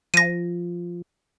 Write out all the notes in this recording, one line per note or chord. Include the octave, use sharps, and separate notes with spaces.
F3 A#6 D#7